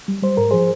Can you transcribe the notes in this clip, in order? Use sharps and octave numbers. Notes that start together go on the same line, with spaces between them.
G3
G3 C5
G#2 A#4
F3 G#4 C5